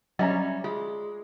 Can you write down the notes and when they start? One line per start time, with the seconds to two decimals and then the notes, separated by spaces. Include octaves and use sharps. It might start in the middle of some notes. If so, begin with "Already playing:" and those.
0.19 F#3 G3 C#4 D#5 E5 A#5
0.64 G#3 F4